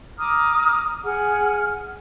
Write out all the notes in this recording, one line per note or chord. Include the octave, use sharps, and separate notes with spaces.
A#5 D6 D#6 F6
G#4 F#5 F6